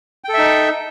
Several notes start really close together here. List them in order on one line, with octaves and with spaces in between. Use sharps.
G5 A4 E5 D#4